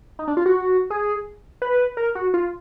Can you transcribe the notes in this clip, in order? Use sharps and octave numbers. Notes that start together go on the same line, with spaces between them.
D#4
D4
F4
F#4
G#4
B4
A#4
F#4
F4